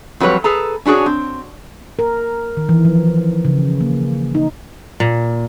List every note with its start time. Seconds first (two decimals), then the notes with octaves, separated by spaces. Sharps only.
0.20 F2 F#3 G3 B4 C#5
0.44 G#4 A4 B4 A#5
0.85 C#4 D4 F#4 G#4 C#5
1.06 C4
1.99 A#4
2.57 D#3
2.69 E3
2.85 F3
3.45 C#3
3.81 A#3
4.35 D#4
5.00 A#2